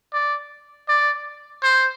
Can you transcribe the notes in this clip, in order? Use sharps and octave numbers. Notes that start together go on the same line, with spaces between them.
D5
D5
C5